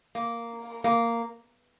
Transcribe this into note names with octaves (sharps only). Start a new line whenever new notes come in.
A#3
A#3